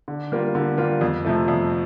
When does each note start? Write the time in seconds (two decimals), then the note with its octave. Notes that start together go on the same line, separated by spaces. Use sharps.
0.08 D3
0.32 G3 A#3 F4
0.55 D3
0.78 G3 A#3 F4
1.01 F2
1.25 C3 F3 A3
1.48 F2